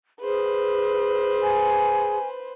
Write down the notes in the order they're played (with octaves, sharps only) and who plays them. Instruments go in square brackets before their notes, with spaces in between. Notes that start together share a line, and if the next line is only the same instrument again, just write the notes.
[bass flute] G#4 [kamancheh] B4 C5
[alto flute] G#5